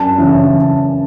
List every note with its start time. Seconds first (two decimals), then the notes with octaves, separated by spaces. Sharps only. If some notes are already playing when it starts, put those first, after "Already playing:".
Already playing: F#2 A5
0.18 C#3 E3 C#4